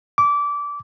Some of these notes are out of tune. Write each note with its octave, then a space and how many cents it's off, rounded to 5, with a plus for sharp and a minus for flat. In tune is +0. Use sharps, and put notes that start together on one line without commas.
D6 -20